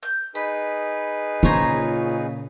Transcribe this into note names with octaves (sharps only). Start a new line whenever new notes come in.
G6
D#4 G#4 B4 B5
A#2 C#3 F4 C5 C#5 A#5